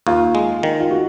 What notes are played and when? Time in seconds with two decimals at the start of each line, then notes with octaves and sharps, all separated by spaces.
0.07 D#2 F4
0.35 G#3
0.63 D#3
0.79 F4
0.91 F#4